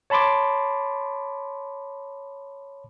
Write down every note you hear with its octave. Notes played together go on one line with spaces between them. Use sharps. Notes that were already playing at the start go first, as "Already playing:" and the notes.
C#5 A5 B5 C6 D6